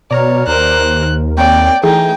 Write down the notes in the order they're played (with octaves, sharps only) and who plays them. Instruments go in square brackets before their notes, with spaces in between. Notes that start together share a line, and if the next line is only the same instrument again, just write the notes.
[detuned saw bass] B2 [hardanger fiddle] C#5 [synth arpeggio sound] D5 A#5 F6
[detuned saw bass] D#2 [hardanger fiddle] A#4 C5 [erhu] F#6
[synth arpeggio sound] A#4
[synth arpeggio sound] A#3 C4 C#5 [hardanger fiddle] D5 [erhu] G5
[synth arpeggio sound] E3 A3 G#4 [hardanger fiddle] D#4 [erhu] G5